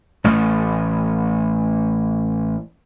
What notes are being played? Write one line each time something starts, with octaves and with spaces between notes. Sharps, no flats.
A1 A3